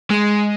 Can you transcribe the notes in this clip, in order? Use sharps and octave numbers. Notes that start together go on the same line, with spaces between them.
G#3